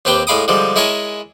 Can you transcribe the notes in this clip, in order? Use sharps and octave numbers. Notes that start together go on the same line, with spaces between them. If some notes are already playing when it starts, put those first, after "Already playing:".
D#2 C4 G4 B4 G5
A2 G#3 F5 B5 D6 D#6
D3 F3 G3 G#3
G#3 E4 A#4 C#5 G#5 A5